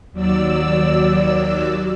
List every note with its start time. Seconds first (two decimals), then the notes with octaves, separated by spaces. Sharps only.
0.12 D#2 F#3 D5 E6